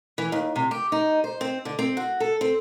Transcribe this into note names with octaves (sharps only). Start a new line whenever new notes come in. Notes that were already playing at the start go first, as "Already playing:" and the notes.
E3
D#2
C3
G4
D#4
C5
C4
D3
C4
F#4
A4
C4